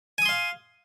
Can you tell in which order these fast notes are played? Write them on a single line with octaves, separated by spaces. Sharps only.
G#5 D#6 C6 F5